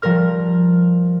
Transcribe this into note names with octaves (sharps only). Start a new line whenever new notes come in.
F3 G3 A#4 F6